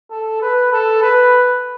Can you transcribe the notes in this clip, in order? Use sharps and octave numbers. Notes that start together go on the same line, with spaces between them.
A4
B4
A4
B4